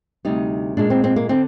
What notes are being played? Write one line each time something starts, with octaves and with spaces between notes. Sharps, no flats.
D2 C3 G3 D#4
A#2 G#3 D4
C4
C4
A#3
D3 C4